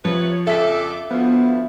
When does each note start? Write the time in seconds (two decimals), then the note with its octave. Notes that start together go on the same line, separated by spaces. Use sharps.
0.05 C3 F3 B4 C#5
0.47 F2 C#3 A4 E5 D6 B6
1.11 D2 F3 B3